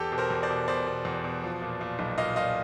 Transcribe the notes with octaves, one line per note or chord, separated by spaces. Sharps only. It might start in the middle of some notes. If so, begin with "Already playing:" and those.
Already playing: E2 G4 A4
B2
A#4 C5
E2
C5 D5
B2
B2 C5 D5
B2
E2
B2
F3
A#2
A#2
B1
A#2 D#5 F5
A#2 D#5 F5